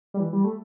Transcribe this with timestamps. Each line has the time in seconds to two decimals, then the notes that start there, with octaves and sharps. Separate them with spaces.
0.14 G3
0.20 E3
0.33 G3
0.44 A3